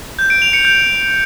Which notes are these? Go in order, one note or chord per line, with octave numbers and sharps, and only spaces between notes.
G6
D7
F7
C#7
G6